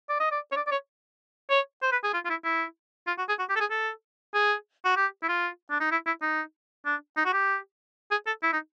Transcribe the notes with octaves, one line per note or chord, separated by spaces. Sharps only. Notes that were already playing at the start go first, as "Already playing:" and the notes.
D5
D#5
D5
C#5
D5
D5
C#5
C#5
C5
B4
G#4
F4
F4
E4
E4
F4
F#4
G#4
F#4
G4
A4
G#4
A4
G#4
F#4
G4
E4
F4
D4
D#4
E4
E4
D#4
D4
D#4
F#4
G4
G#4
A4
E4
D#4